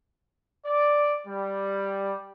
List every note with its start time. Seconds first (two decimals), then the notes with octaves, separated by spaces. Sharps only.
0.66 D5
1.27 G3